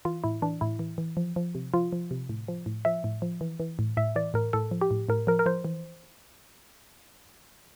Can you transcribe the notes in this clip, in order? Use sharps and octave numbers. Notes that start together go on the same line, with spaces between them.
E3 F4
A2 E4
E3 D4
A2 E4
E3
E3
F3
F3
C3
F3 F4
F3
C3
A2
F3
A2
F3 E5
A2
F3
E3
E3
A2
A2 E5
E3 D5
A2 A#4
A2 A4
F3
G4
A2
A2 A#4
F3 A#4
A#4
F3 C5
E3